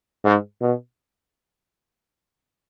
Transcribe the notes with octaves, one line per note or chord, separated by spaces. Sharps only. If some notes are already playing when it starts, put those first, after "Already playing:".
G#2
B2